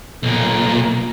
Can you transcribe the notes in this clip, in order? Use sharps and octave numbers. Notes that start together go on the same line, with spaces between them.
B1 A#2